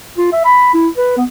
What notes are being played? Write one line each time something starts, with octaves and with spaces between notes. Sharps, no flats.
F4
E5
B5
E4
B4
B3